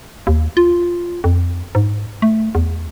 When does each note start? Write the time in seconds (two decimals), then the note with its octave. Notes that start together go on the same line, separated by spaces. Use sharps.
0.27 D#2
0.57 F4
1.24 F2
1.75 G#2
2.22 A3
2.55 E2